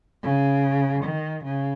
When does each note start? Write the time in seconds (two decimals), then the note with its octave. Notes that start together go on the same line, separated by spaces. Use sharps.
0.23 C#3
1.04 D#3
1.44 C#3